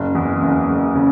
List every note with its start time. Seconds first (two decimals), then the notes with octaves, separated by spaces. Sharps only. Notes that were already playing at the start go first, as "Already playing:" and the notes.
Already playing: F#1
0.15 E2
0.42 F#1
0.69 F#1
0.95 C#3